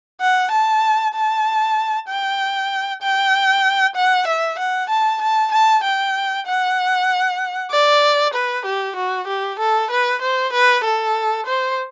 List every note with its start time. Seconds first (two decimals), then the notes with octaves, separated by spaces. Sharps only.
0.21 F#5
0.51 A5
1.15 A5
2.08 G5
3.02 G5
3.95 F#5
4.27 E5
4.59 F#5
4.90 A5
5.22 A5
5.52 A5
5.84 G5
6.47 F#5
7.71 D5
8.34 B4
8.66 G4
8.96 F#4
9.27 G4
9.59 A4
9.91 B4
10.22 C5
10.53 B4
10.84 A4
11.46 C5